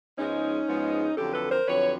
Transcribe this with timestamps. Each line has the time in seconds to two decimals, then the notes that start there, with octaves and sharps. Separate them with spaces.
0.18 G#2 F3 G#3 B3 C#4 D#4
0.68 G#2 F3 G#3 B3
1.17 F2 D3 F#3 G4 A4
1.34 A4 B4
1.51 A#4 C5
1.68 F2 D3 F#3 B4 C#5